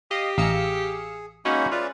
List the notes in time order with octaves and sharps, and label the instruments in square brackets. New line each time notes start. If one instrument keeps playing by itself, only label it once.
[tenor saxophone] G4 [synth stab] D#5 [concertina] F5
[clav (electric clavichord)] A1 G#5 [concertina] D#5 A#5 D#6 [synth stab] F5 E6 C#7
[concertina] G#4
[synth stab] G#3 C#4 [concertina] A#3 D#4 B5 [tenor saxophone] F#4
[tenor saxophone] F4 [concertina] B4 D5 E5